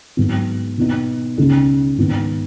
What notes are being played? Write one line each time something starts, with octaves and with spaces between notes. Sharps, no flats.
G#2 F#3 B3
B2 B3 D#4
C#2 C#3 G#3 D#4
G#2 D#3 B3